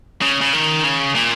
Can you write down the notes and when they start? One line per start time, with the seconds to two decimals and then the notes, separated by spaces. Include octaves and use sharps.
0.21 C#3
0.41 C#3
0.53 D#3
0.83 C#3
1.15 A#2